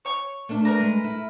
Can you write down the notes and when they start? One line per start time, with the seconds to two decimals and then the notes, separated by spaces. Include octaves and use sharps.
0.05 C#5 C#6
0.49 A3 A#3 D4
0.65 A#4 B4 A#5
0.80 G#3
1.04 E4